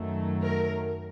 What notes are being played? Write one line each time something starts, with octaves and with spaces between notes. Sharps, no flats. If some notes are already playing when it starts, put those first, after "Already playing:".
Already playing: F#2 D#3 F#3 A3
A#4